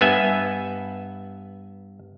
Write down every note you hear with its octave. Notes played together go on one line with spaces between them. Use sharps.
G2 B3 E5 G#5